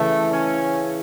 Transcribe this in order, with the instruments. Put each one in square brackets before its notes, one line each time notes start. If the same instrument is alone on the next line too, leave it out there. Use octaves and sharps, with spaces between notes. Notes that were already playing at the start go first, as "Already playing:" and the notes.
Already playing: [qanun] C#3 E3 [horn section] A3
[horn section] C#4